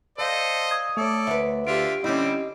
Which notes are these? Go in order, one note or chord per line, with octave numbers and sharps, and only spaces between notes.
A4 C5 D5 D#5 F5
D#6 G#6
A3 A4 C#5 D5
D2 B4 E5
D3 F4 G4 E5 D7
D3 G3 C4 C#4 E4 D#5